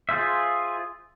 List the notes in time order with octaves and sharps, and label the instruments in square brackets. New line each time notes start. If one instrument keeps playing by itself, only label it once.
[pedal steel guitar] F4 G#4 C5 E5